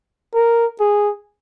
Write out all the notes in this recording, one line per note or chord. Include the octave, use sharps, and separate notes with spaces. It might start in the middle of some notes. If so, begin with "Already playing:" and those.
A#4
G#4